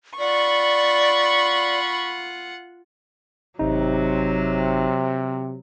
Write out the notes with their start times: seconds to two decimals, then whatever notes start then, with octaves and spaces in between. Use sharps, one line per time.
0.19 F4 D5 F#5 B5 C#6
3.59 G#1 C3 F#3 D#4